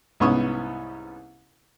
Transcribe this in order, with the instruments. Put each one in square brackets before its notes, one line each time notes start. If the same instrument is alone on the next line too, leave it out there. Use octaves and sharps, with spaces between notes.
[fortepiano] C2 G#2 B3 C#4 C#6 D#6